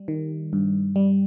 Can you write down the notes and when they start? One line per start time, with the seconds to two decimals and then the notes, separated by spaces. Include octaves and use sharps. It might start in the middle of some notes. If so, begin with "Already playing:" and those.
Already playing: G3
0.08 D#3
0.53 G2
0.96 G3